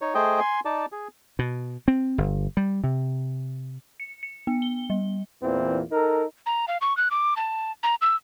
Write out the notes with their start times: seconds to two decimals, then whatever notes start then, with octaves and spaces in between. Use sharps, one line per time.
0.01 D#4 C#5
0.15 A3 G#4 C5 D#5 G5
0.40 G#5 C6
0.65 D#4 D5 A5
0.92 G#4
1.39 B2
1.88 C4
2.18 G1
2.57 G3
2.84 C3
4.00 C#7
4.23 C#7
4.47 B3
4.62 G7
4.90 G3
5.41 E2 A#2 E3 C4
5.91 D#4 A4 A#4
6.46 A#5
6.68 F5
6.81 C#6
6.97 F#6
7.11 D6
7.37 A5
7.83 A#5
8.02 E6